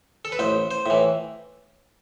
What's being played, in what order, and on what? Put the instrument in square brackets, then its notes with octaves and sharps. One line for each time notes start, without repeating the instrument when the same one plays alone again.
[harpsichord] A4
B4
A1 C5
C5
A2 E3